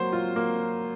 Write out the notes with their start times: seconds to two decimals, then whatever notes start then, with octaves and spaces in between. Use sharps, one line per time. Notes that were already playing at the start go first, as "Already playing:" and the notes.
Already playing: F#3 A#3 C5
0.12 F4
0.36 A#3